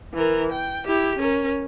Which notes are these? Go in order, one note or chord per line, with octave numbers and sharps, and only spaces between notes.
E3 A#4
G5
E4 G4
C#4 A#4